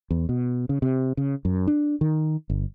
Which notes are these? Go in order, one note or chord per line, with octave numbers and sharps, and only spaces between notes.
E2
B2
C#3
C3
C#3
F#2
D4
D#3
G1